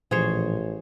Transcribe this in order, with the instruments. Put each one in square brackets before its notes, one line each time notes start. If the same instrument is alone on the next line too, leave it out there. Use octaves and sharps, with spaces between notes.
[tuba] A1 [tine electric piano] A#2 E3 F3 [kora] G#4 C5 C#5